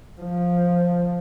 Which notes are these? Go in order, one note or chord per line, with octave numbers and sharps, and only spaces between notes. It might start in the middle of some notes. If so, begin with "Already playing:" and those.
F3